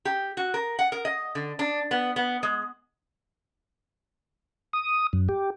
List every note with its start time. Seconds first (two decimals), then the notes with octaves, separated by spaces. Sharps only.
0.05 G4
0.37 F#4
0.54 A#4
0.79 F#5
0.92 A#4
1.05 D#5
1.35 D3
1.59 D4
1.91 B3
2.16 B3
2.43 G#3
4.73 D#6
5.13 F#2
5.29 G4